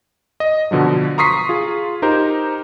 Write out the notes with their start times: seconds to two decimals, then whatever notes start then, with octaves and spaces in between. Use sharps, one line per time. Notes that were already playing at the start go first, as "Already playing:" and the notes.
0.40 D#5
0.71 B2 D3 F3 F#3
1.18 A#5 C6 C#6 D#6 B6 C7
1.49 F4 G#4
2.02 D#4 G4 A#4 C5